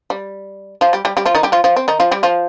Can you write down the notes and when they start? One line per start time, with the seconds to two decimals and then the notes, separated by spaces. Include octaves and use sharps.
0.10 G3
0.81 F3 F4
0.93 G3 G4
1.05 G3 G4
1.17 G3 G4
1.26 F3 F4
1.35 D#3 D#4
1.43 G3 G4
1.52 F3 F4
1.64 F3 F4
1.76 C4
1.88 D#3 D#4
2.00 F3 F4
2.11 G3 G4
2.23 F3 F4